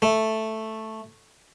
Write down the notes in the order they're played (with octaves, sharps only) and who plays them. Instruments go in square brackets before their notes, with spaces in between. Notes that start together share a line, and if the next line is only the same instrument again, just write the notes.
[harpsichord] A3